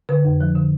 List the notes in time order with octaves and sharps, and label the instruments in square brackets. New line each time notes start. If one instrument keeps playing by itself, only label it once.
[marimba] D3 B4
F2
F3
D3